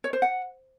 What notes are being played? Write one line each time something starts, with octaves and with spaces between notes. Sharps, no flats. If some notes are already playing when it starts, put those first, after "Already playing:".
C#5
C5
F#5